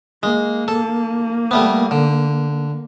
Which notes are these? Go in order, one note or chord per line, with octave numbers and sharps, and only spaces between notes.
G#3 A#3
A4
G3 A3 B3
D3